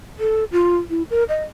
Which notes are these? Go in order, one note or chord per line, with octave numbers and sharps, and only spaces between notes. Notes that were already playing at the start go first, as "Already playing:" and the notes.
A4
F4
E4
A#4
D#5